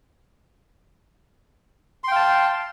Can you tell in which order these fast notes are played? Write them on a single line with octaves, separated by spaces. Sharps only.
C6 G5 F5 A5